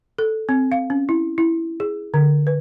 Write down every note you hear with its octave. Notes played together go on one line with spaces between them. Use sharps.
A4
C4
F5
C#4
E4
E4
G#4
D3
B4